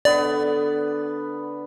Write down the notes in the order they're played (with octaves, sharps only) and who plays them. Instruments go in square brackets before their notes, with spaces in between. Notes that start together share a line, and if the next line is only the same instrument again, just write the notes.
[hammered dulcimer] D3 B3 [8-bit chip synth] D5